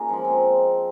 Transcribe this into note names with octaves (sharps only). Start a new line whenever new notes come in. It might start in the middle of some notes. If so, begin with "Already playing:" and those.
Already playing: A#3 C#4 D#4 F4 G#4 A#4 D#5
F3 G#3
C4